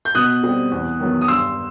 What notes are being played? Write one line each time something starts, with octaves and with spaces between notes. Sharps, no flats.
G6
B2 D#6 F#6
G3 C4
E2
D#3 F#3 B3
D#6
G2 C6 E6